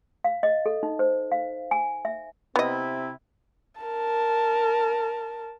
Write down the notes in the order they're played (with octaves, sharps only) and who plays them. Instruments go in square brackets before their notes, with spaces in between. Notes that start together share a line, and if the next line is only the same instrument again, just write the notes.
[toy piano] F5
D#5
A4
D#4
C5
F5
G#5
E5
[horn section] C3 C4 E4 [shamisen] B3 D#5
[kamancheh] A#4 A5